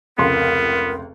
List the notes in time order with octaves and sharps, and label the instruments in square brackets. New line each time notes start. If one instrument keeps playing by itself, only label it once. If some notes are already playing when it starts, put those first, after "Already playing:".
[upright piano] F1 C#2 C6 [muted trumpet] B3 [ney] A#4